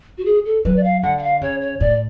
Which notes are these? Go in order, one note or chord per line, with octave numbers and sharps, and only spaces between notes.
F#4
G#4
A4
F#3 B4
D5
F5
D3 F#5
F#5
F5
C#3 C#5
C#5
A2 D5